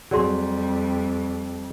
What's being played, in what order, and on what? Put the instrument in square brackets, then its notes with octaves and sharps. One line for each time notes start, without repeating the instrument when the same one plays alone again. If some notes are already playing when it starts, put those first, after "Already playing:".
[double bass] F2 G3 [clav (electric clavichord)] F#3 G#4 [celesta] D5 C6